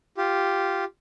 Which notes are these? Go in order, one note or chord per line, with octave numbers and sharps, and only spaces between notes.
F4 G4